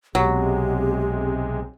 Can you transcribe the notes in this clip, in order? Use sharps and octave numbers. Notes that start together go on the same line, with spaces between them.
B1 C3 F#3 G#3 G4